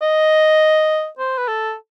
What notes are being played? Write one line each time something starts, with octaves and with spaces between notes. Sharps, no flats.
D#5
C5
B4
A4